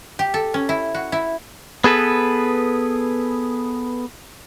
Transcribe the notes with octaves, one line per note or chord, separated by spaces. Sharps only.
G4
A4
C#4
E4
F#4
E4
B3 G#4 A4 B4